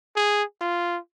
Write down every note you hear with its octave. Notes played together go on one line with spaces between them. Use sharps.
G#4
F4